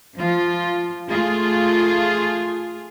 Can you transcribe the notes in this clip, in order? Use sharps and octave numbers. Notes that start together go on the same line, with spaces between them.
F3 F4
A3 F4 G#4